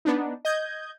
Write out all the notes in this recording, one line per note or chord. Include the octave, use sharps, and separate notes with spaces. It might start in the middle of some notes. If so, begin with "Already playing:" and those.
B3 D4 D#4
D#5 G6 G#6